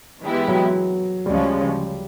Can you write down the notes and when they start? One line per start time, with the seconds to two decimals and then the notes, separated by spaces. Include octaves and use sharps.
0.22 E3 G#3 B3 E4 G4
0.48 F#3
1.26 D2 C#3 F3 G3 G#3 C#4